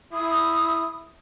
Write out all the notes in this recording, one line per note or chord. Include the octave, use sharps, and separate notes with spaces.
E4 D#6